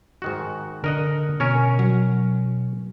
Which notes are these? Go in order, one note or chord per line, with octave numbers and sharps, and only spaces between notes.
G#2 D#3 F#4
D3 A#4 D#5 F#5
B2 C#4 A#4 C#5
F#3